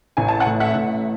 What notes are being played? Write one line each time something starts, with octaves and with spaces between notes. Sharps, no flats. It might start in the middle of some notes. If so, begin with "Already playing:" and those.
A1 G#5
A5
F#5 G#5
A2
E5 F#5
A1